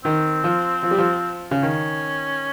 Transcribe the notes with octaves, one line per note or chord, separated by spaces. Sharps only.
D#3 C4
F3
F3
G3
F3
C#3
D#3 C#4